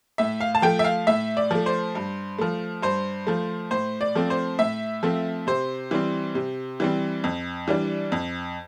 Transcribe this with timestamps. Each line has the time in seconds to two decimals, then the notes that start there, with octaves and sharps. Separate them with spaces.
0.18 A2 E5
0.40 F5
0.55 A5
0.62 F3 A3 G5
0.79 E5
0.84 F5
1.07 A2 E5
1.37 D5
1.51 F3 A3
1.66 C5
1.95 G2
2.38 F3 A3
2.83 G2 C5
3.27 F3 A3
3.71 A2 C5
4.01 D5
4.15 F3 A3 C4
4.30 C5
4.59 A2 E5
5.03 F3 A3 C4
5.47 C3 C5
5.91 E3 G3 C4
6.35 C3
6.80 E3 G3 C4
7.24 F2
7.68 E3 G3 D4
8.12 F2